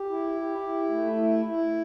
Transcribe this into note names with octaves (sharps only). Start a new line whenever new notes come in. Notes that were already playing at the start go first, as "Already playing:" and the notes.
Already playing: G4
E4
G4
E4
A3
E4
E4